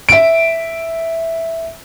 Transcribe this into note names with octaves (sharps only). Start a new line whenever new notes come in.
E5 D7